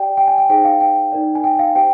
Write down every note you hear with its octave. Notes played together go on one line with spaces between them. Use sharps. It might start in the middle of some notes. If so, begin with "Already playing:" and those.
Already playing: G4 D5 G5
G5
G#5
G5
D#4 G#4 C5 G5
F5
G5
D#4 A#4 D5
G#5
G5
F5
G4 C5 G5